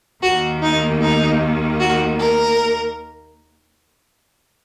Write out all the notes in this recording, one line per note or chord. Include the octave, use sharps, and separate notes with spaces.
D#2 D#3 A#3 F#4
D#4
D#4
F#4
A#4